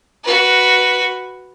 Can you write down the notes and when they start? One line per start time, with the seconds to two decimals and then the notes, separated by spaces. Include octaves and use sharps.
0.23 F#4 B4